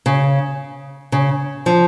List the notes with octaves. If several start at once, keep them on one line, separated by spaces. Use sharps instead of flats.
C#3
C#3
F3